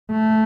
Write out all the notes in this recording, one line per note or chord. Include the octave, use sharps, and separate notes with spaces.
A3